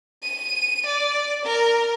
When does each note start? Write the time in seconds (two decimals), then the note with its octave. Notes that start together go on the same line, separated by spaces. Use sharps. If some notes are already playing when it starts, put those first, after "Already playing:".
0.23 D#7
0.86 D5
1.45 A#4